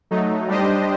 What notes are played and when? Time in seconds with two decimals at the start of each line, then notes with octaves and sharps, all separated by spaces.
0.11 F#3 A3 D#4
0.48 G3 D4 G4 C5 D#5